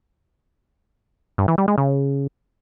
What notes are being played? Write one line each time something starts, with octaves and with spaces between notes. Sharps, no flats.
G2
E3
G3
G#3
C#3